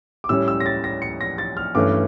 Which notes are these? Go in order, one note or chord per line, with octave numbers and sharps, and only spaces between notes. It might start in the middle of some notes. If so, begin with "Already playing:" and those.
D6
A2 G3 C#4 E6
E6
A#6
A6
A#6
C#7
A#6
A6
F6
G2 E3 A3 C#4 D6